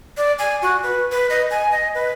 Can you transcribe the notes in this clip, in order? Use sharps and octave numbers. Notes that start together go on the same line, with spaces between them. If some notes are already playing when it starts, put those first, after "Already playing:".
D5
G#5
F#4
B4
B4
D#5
G#5
D#5
B4